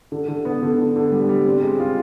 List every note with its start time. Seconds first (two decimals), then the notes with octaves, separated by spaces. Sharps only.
0.12 D3
0.29 D3
0.45 B3
0.62 D3
0.78 D3
0.96 D3
1.12 G3
1.29 G3
1.46 C4
1.62 G#3
1.80 F4